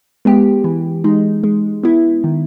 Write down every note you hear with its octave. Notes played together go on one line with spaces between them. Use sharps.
G#3 B3 G4
E3
G#3 D#4
G#3
B3 E4
D#3